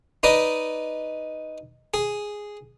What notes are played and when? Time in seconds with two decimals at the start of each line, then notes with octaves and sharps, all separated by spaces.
0.23 D#4 B4 D5 D#5
1.94 G#4